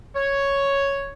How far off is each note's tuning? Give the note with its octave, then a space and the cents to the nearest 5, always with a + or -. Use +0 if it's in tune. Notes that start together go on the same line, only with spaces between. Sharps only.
C#5 +0